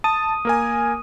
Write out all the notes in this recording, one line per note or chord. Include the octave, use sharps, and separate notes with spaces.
A5 D#6 D#7
A#3 A#4 G#5